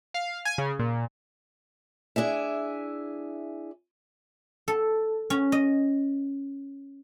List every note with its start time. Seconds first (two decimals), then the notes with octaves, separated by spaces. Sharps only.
0.14 F5
0.45 G#5
0.58 C#3
0.79 A#2
2.16 D4 E4 G#4 E5
4.68 A4
5.30 C#4
5.52 D#5